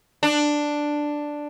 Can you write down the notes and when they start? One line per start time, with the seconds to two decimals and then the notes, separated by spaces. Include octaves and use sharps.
0.23 D4